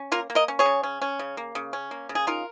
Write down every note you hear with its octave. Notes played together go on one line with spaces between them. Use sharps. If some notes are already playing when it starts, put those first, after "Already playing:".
Already playing: C#4
A#3 F4 A#4
A#3
A#4 D#5
C#4
G#4 C#5
C#3
C#4
C#4
C#3
A#3
C#3
C#4
A#3
C#3
G#4
D#4 F4 A#4